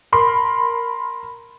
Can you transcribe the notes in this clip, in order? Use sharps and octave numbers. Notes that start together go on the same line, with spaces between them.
A#4 B5 C6